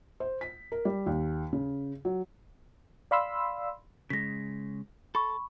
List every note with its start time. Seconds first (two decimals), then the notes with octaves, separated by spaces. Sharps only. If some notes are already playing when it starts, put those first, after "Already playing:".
0.20 C5
0.41 B6
0.72 A#4
0.85 G3
1.06 D#2
1.53 C#3
2.05 F#3
3.11 D5 F5 B5 C6 E6
4.10 C#3 G#3 A#6 B6
5.15 A4 B5 C#6